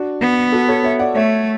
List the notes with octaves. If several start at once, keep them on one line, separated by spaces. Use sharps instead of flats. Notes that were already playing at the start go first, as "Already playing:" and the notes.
Already playing: D4 F#4
B3
F#4 A4
A4 C#5
C#5 E5
D5 F#5
A3 C#5 E5